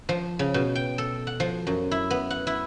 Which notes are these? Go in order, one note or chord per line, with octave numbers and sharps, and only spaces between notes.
F3
C#3
B2
G5
A4
F#5
F3
F#2
E4
B3
F#5
E4